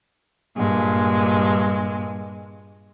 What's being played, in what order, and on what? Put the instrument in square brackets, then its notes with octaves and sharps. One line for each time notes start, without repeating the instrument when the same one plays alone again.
[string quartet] G2 A#2 G#3